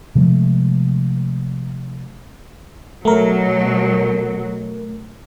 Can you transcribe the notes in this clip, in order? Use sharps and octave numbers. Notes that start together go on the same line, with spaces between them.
C3 F3 G#3 A3
B2 F#3 A3 A#4